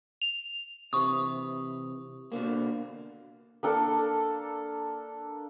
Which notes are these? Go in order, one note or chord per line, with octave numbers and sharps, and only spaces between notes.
F7
C3 E3 C#6 D#6
B2 D3 A#3
A#3 D4 A4